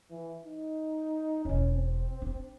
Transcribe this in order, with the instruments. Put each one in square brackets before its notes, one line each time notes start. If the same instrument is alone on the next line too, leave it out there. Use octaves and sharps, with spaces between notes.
[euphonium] E3
D#4
[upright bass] E1 E4 [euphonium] C#4
[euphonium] C4
[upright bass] D4